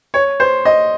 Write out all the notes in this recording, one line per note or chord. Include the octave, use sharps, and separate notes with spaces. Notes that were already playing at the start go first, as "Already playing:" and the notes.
C#5
C5
D#5